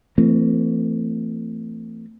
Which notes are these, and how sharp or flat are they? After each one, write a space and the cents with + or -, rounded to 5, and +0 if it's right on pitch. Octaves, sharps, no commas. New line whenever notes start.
E3 +45 A3 +35 C4 +0